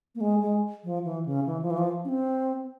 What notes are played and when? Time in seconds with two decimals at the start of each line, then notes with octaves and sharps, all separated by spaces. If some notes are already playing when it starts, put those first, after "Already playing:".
0.15 A#3
0.21 G#3
0.41 G#3
0.84 F3
1.04 E3
1.26 C#3
1.46 E3
1.62 F3
1.71 E3
1.78 F3
2.05 C#4
2.09 C4